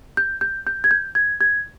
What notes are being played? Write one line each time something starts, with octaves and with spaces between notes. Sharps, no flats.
G6
G6
G6
G#6
G6
G#6
G#6